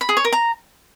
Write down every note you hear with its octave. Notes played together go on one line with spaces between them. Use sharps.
B5
G#4
C#5
A#4
A#5